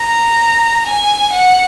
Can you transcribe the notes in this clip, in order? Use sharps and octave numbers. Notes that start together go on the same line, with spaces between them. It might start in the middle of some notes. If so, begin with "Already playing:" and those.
Already playing: A#5
G#5
F#5